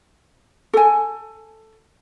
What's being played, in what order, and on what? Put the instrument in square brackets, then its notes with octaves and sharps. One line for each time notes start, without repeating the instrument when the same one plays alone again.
[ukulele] A4 G#5